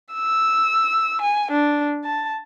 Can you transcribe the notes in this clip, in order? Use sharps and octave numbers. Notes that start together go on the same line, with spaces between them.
E6
G#5
D4
A5